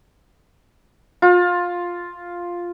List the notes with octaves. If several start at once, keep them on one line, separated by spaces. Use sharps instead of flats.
F4